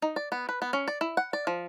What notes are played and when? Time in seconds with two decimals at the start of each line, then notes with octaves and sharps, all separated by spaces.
0.02 D#4
0.16 D5
0.32 B3
0.49 B4
0.62 B3
0.73 C#4
0.88 D5
1.01 E4
1.17 F#5
1.33 D5
1.47 F3